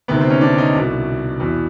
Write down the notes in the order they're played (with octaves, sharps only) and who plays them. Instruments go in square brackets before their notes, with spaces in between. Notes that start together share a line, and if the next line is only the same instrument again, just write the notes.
[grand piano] D2 C3 D#3 B3
C4
C#4
D4
D#4
C2 B2
E2 B2